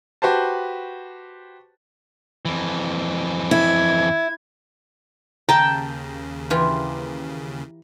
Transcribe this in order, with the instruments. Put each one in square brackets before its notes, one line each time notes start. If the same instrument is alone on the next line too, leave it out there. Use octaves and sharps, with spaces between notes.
[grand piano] F#4 G4 B4 C5 A5
[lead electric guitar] F2 E3
[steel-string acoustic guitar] E4 [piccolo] G#6
[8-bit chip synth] D#2 C#3 [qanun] G5 A5 [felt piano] A#5
[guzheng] E3 F4 G4